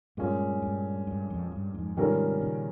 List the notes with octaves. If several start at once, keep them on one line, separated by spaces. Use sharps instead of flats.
G2 A#2 G#3 C#4
G2
G2
F2
G2
F2 G#2
G#2 C3 D#3 G3 C#4 F4 A#4
A#2 C#3